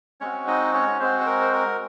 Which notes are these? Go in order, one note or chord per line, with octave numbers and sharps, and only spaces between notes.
G#3 C4 C#4 F#4 C#5
D#4 D#5
C#4 C#5
G#3 C4 F#4 C5
C5
A#4
C5
A#4